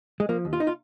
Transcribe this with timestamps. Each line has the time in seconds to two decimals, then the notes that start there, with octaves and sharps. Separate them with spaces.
0.20 G#3
0.29 F3 A#3
0.45 D#2
0.53 F4
0.60 D#4
0.67 F4